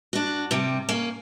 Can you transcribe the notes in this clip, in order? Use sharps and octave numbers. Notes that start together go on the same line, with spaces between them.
D4 F#4
C3 G3
A#3 C#4